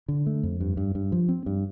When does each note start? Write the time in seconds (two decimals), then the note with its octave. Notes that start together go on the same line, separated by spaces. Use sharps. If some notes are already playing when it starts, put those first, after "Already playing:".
0.08 D3
0.26 A3
0.43 F2
0.61 G2
0.77 G2
0.95 G2
1.12 F3
1.29 C4
1.46 G2